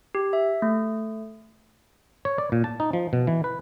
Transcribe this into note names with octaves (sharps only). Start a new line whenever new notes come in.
G4
E5
A3
C#5
D5
A#2
A5
D#4
F3
B2
E3
B4